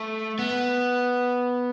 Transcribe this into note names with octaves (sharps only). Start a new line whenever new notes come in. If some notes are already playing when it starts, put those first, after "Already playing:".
Already playing: A3
B3